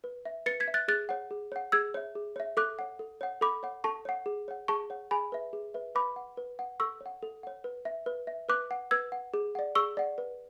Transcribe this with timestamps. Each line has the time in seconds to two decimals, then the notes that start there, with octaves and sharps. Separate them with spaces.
0.04 B4
0.25 E5
0.46 B4 A6 C#7
0.60 G#6 B6
0.68 E5
0.74 F#6 A6
0.88 G#4 F#6 A6
1.09 C#5 F#5
1.31 G#4
1.52 C#5 F#5
1.72 G#4 E6 G#6
1.94 C#5 E5
2.15 G#4
2.36 C#5 E5
2.57 A4 D6 F#6
2.79 C#5 F#5
2.99 A4
3.21 C#5 F#5
3.41 A4 B5 D6
3.63 C#5 F#5
3.84 A4 A5 C#6
4.05 C#5 F#5
4.26 G#4
4.48 C#5 F#5
4.68 G#4 A5 C#6
4.90 C#5 F#5
5.11 G#4 G#5 B5
5.32 B4 E5
5.53 G#4
5.74 B4 E5
5.95 B4 B5 D6
6.16 F#5
6.37 B4
6.59 F#5
6.80 A4 C#6 E6
7.01 C#5
7.06 F#5
7.23 A4
7.43 C#5 F#5
7.64 B4
7.85 E5
8.06 B4
8.27 E5
8.49 B4 D6 F#6
8.71 F#5
8.91 B4 E6 G#6
9.12 F#5
9.34 G#4
9.55 D5 F#5
9.75 G#4 C#6 E6
9.97 D5 F#5
10.18 B4